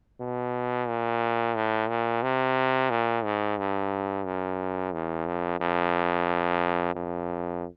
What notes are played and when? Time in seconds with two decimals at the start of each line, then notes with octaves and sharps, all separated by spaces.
0.20 B2
0.88 A#2
1.56 A2
1.89 A#2
2.23 C3
2.90 A#2
3.24 G#2
3.58 G2
4.25 F#2
4.92 E2
5.26 F2
5.60 F2
6.95 F2